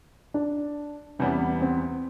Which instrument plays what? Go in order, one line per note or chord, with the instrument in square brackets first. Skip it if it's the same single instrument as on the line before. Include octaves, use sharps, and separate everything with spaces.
[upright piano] D4
[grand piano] E2 C3 E3 G3 B3 [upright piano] C#4
[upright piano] C4